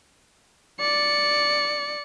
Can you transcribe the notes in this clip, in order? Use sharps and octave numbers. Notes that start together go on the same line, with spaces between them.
D5 C#7